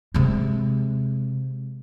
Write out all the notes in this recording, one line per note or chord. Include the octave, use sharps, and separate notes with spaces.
C3 G#3